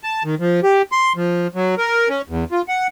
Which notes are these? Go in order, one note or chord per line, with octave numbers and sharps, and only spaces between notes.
A5
D#3
F3
G4
C6
F3
F#3
A#4
C#4
E2
F4
F#5